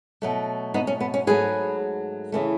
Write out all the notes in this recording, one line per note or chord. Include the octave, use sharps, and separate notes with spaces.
B2 F#3 A3
B3 D#4
C#4
B3
C#4
G#2 F#3 A3 G#4 B4
C#3 E3 A3